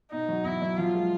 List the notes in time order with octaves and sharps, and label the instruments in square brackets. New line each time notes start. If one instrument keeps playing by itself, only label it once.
[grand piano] B2 [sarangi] D#4
[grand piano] F#3
[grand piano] E2 [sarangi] E4
[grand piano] F#3
[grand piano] F3 [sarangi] F4
[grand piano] G#3